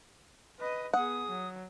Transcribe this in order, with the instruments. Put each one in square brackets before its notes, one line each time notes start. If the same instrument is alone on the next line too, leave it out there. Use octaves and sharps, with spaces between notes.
[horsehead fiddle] B4 D#5
[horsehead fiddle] B3 G#4 [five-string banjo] F#5 [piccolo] D#6
[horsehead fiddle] F#3